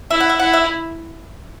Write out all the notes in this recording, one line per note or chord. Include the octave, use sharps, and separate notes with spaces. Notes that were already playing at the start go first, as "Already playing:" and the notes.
E4 E5
F#5
E5
E4 F#5
E5